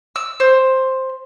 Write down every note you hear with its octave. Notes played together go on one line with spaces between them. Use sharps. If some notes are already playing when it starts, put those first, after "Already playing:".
E6
C5